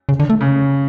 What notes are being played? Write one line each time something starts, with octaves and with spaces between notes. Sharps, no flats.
C#3
D3
A3
C#3